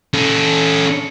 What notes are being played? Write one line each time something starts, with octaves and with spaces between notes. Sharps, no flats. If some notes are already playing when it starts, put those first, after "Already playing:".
C#4 A4